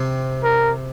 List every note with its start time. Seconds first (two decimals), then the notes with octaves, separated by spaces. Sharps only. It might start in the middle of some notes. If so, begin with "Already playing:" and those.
Already playing: C3
0.44 A#4